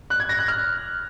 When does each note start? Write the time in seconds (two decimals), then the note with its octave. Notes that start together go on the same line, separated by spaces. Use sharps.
0.10 F#6
0.20 G#6
0.29 A#6
0.39 F#6
0.48 F6